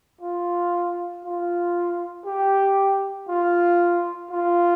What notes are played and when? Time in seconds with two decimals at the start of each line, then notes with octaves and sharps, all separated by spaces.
0.21 F4
1.25 F4
2.26 G4
3.28 F4
4.31 F4